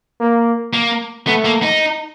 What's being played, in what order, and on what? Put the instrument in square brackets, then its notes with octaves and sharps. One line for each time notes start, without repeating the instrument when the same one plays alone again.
[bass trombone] A#3
[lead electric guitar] A#3
[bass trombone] A3 [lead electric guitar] B3
[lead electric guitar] A#3
D#4